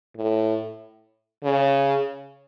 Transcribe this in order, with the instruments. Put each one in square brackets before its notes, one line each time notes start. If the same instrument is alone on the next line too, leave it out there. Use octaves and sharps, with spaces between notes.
[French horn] A2
C#3